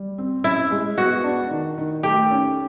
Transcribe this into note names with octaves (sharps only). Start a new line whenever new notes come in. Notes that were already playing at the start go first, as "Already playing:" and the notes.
Already playing: G3
C4
C#4 E4
G#3
B3 F#4
D4
D#3
D#3
A3 G4
C#4